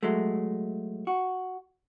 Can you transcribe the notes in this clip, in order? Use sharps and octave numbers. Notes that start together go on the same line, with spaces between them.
F#3 G#3 A3
F#4